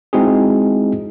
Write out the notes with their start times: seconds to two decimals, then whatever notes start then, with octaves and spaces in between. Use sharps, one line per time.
0.13 G#3 C4 D#4 E4 F#4 G#4